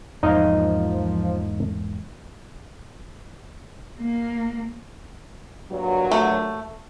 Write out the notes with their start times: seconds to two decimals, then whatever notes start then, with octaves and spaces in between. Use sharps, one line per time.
0.23 E2 G#2 F3 A#3 D#4 D#5 F5
3.99 A#3
5.71 G2 A#2 F#3
6.12 A3